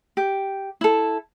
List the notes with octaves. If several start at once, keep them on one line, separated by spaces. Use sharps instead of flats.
G4
E4 A4